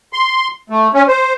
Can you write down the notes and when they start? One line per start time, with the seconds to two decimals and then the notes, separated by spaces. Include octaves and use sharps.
0.13 C6
0.70 A3
0.94 C#4
1.08 C5